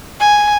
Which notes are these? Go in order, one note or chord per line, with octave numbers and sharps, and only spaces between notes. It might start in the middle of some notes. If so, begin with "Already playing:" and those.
G#5